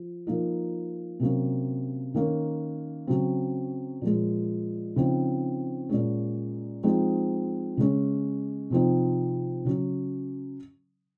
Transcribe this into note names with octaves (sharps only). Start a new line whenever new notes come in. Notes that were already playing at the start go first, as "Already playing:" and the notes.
Already playing: F3
F3 A#3 D#4
C3 F#3 A#3 C#4
D#3 A#3 C#4
C#3 F#3 C4
A#2 F3 G#3
C#3 F3 C4 D#4
A#2 G#3 C#4
F3 G#3 C4 D#4
C#3 G#3 C#4
C3 F3 C4 D#4
C#3 F#3 C#4